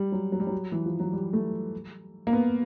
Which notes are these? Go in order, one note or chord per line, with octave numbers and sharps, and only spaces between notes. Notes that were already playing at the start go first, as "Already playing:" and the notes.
Already playing: G3
F#3
F#3
G3
F#3
E3
F3
F#3
G3
A3
A#3
B3